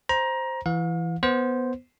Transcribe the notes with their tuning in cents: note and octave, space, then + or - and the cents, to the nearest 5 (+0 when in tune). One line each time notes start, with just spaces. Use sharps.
C5 +0 A#5 +20
E3 +15 F5 +40
B3 +0 C5 -5